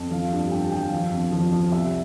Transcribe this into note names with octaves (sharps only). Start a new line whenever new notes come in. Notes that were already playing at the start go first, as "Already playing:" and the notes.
Already playing: F2
F3 F5
G2
G2 G5
A5
F3 G5
F5
F3
F2
F3
F3
C2 E5